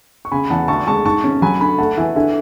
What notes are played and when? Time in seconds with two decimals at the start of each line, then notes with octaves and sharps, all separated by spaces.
0.25 C#6
0.32 C#3 G#5 B5
0.50 E2 F#5 A5
0.68 D2 A5 C#6
0.87 G#3 A5 C#6
1.05 G#2 A5 C#6
1.24 C#4
1.42 F#3 G#5 B5
1.60 D3 G#5 B5
1.78 A3 F#5 A5
1.97 E3 E5 G#5
2.16 D3 E5 G#5